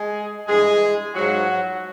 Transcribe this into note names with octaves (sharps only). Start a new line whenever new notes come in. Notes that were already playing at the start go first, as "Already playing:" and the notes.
Already playing: G#3 G#4
G2 E3 G#3 G#4
G#2 F3 F#3 F#4